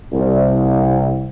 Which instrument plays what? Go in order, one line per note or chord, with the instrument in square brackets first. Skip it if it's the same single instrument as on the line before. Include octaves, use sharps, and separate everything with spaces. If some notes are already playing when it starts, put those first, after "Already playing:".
[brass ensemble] C2